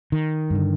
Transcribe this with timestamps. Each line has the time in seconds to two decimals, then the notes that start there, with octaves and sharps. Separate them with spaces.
0.12 D#3
0.50 G2 D3